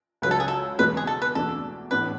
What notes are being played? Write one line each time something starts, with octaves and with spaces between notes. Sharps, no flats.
C#2 C#3 F#3 B4
A4
G#4
A4
E2 B2 G#3 B4
G#4
A4
B4
E2 B2 A3 D4 A4
A1 A2 E3 B3 D4 B4